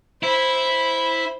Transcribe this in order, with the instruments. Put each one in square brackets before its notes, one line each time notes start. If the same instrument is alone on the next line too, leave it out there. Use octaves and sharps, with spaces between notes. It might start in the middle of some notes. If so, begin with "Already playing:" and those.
[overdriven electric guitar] E4 [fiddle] C5 B5